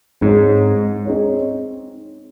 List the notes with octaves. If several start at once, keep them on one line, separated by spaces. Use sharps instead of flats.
G#2 C4 D#4 G#4 C#5
C4 D#4 G#4 C#5